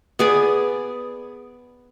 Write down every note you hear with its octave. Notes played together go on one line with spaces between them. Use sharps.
B3 G#4 D5